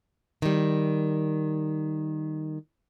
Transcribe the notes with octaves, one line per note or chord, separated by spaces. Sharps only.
D#3 G3